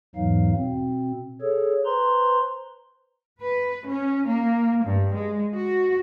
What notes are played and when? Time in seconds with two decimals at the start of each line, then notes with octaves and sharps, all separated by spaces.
0.15 E2 G#2 E3 F#3 D#4 F5
0.55 B2 C4
1.41 G#4 A4 C#5
1.85 B4 C5 A#5 C6
3.41 B4
3.87 C#4
4.28 A#3
4.84 G2
5.16 G#3
5.54 F#4